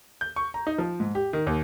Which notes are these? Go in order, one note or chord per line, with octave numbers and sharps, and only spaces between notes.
G6
C#6
A#5
D#4
F3
G#2
G4
D#3
D#2